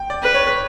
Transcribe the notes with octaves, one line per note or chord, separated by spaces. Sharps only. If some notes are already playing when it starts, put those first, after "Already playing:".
Already playing: G5
D5
B4
C#5